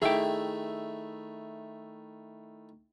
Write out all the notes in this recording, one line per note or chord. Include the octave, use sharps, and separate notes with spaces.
D#3 A3 E4 G#4 G5